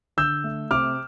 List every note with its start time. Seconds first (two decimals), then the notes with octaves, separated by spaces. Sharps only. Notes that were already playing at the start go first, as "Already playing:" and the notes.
0.17 D3 E6 G6
0.44 A3
0.71 C3 D6 F6